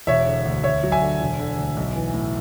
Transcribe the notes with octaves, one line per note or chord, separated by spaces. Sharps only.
E1 C#5 E5
D3
D2
D2 C#5 E5
F#3
E5 G#5
D3
E1
D3
D2
B1
E3
A2